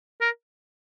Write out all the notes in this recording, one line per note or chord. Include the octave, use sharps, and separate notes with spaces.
A#4